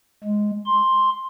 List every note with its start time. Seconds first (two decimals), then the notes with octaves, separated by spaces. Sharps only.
0.24 G#3
0.66 C6